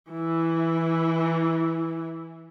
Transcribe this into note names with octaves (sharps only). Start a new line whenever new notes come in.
E3 E4